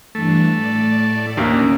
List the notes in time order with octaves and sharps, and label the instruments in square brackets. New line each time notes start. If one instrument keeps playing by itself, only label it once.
[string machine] G2 E3 D4 [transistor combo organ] A3
[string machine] A2 D5
[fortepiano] D#2 A#3 [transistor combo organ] D#3 D4 [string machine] C#4